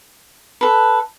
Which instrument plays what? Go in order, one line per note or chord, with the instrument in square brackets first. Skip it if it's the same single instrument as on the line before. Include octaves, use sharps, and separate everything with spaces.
[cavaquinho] A4 B4